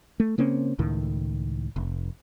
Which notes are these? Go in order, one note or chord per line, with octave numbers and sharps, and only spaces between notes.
A3
C#3 A#3 C4 C#4
C#2 A2 D#3
F1